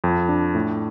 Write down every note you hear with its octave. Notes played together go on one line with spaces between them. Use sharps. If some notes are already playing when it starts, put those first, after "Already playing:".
F2
D4
A2